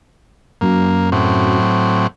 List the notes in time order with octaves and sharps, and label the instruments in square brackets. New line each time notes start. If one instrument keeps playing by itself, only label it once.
[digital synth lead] F#2 [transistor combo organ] A#3
[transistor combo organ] A2 F#3 C4